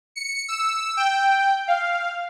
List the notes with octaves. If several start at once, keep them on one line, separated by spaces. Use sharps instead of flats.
C#7
E6
G5
F5